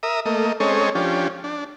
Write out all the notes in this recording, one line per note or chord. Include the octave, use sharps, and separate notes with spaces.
A#4 E5 D#6
A3 A#3 D#5
G#3 C4 C#4 A4 C#5 D#5
F3 C#4 D4 G4
D4